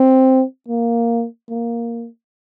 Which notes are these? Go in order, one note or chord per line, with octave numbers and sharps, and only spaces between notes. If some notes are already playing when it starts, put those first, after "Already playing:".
Already playing: C4
A#3
A#3